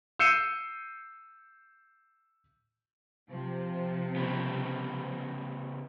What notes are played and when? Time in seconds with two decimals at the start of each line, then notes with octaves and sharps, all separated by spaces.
0.19 E6 G6 C7 C#7 D#7 E7
3.28 C3 F3
4.16 C#3 G3 B3